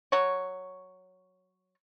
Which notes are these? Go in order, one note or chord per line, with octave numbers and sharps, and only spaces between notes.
F#3 C#5